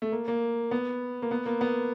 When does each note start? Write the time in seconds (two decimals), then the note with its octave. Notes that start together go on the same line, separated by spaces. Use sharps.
0.02 A3
0.12 A#3
0.28 A#3
0.71 B3
1.22 A#3
1.31 B3
1.46 A#3
1.61 B3